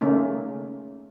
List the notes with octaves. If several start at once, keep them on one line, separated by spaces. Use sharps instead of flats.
C#3 A3 A#3 C#4 D#4